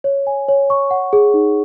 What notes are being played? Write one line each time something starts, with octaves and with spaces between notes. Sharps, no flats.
C#5
G#5
C#5
C#6
F#5
G#4
D#4